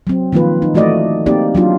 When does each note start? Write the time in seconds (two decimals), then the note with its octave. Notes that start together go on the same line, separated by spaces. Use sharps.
0.07 F#3 C4
0.32 D#3 F3 A#3 F4 B4
0.62 D#4
0.74 E3 A3 F#4 D5 D#5
1.26 A#3 C4 D#4 G4 D5
1.55 F#3 D4 F4